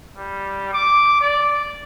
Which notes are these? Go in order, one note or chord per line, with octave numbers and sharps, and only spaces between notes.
G3
D6
D5